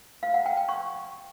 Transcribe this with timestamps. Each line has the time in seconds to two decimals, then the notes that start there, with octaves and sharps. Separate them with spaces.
0.23 F5
0.34 F#5
0.46 G5
0.57 G5
0.69 C#6